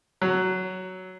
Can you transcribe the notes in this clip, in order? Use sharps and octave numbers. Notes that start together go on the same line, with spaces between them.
F#3